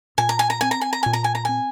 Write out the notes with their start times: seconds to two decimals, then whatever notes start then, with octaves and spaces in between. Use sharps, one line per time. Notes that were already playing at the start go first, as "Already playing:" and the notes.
0.18 A#2 G#5
0.29 A#5
0.39 G#5
0.50 A#5
0.61 C4 G#5
0.71 A#5
0.81 G#5
0.93 A#5
1.03 A#2 G#5
1.13 A#5
1.24 G#5
1.35 A#5
1.45 C4 G#5